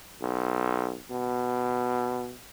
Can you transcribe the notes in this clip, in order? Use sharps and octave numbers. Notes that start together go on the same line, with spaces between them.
B1
B2